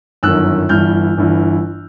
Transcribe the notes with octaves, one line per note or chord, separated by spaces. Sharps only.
G1 F#2 D#3 E6 F#6
G1 G2 E3 F6 G6
G1 G2 E3